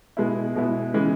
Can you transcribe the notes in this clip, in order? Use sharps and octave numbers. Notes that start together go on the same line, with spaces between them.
B2 G#3 B3 E4
B2 G#3 B3 E4
C#3 E3 G#3